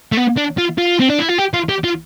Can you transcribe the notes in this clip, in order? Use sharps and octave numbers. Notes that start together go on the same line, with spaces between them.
A3
B3
D4
F4
F4
C4
D4
E4
F4
G4
F4
G4
F4